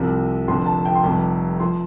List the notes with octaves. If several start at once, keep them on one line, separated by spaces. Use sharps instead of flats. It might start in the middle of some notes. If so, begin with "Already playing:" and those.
Already playing: C2 C3 F3
F1 F2 D3 F3 C6
A5
G5
C6
F1 F2 C3 G3 A5
F3 C6